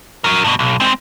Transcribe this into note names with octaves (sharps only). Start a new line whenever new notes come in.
F#4 A#4
G2 B2
B1
G#3 C4